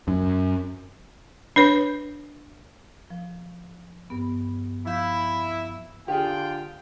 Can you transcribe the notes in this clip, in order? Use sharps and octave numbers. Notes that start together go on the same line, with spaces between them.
F#2
D4 B4 C#5
F3
G2 B3
F3 E4 F5 G6
D3 F4 G4 G#4 G5